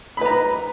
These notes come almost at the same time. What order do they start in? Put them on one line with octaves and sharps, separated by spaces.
B5 B4 A#5